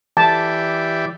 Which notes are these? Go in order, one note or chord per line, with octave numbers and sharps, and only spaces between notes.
E3 G4 D5 A5